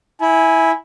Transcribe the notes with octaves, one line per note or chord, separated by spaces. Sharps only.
E4 G#5